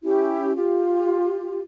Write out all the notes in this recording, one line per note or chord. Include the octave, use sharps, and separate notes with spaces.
C#4 E4 G4
F4 G4